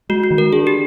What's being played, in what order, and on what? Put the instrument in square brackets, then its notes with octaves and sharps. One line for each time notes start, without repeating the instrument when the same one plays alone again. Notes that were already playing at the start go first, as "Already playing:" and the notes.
[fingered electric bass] G#3 [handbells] F#4
[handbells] F#4
[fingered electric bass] D#3
[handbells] A#4
[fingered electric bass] D4 [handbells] G#4
[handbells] G4